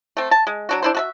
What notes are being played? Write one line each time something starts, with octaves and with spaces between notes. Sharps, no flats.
A3 C4
A5
G#3
F#3 D4 F#4
D4 E4 C5
F#4 A4 E5